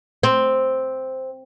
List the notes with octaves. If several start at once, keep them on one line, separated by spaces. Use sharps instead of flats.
C4